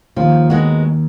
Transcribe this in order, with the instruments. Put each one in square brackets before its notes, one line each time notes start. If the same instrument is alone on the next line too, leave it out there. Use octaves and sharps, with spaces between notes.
[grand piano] D#2 D#3 [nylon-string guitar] F3
[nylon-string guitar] G#3 B3 D#4 F#4